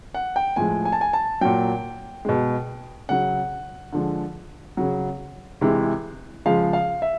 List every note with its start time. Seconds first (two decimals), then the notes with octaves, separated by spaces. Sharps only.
0.14 F#5
0.36 G5
0.56 A2 F3 G#3 G#5
0.85 G#5
0.93 A5
1.01 G#5
1.13 A5
1.41 A#2 F#3 G5
2.25 B2 G#3
3.09 C#3 F#3 F#5
3.93 D3 F3 G#3
4.77 C#3 F#3
5.61 C3 E3 G#3
6.46 C#3 F3 G#3 F5
6.73 F5
7.02 E5